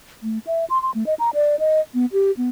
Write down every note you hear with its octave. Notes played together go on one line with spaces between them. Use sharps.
A3
E5
C6
C6
A3
D#5
A#5
D5
D#5
B3
G4
B3